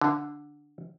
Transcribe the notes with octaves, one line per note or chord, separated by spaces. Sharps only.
D3